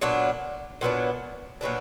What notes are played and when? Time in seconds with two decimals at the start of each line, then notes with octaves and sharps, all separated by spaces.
0.01 A#2 F#3 B3 D4
0.81 A#2 F#3 B3 D4
1.61 A#2 F#3 B3 D4